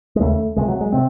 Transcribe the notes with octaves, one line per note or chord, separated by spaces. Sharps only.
G#3
D#2 C#3 A3
C#2 C3 G#3
F#3
G#3
C3 C4